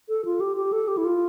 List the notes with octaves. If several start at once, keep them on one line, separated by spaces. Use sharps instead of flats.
A4
F4
G4
G4
A4
G4
E4
F4